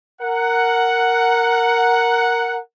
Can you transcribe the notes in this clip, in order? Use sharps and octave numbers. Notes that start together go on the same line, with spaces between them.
A#4 F#5